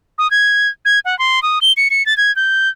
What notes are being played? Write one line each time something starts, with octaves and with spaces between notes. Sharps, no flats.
D#6
G#6
G#6
F#5
C6
D#6
G7
C#7
C#7
A6
G#6
G6